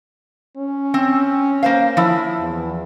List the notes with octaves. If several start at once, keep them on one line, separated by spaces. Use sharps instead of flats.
C#4
C4
A#3 C5 F5
F3 E4
E2